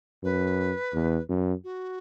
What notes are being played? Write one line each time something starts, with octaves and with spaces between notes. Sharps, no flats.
F#2 B4
E2
F#2
F#4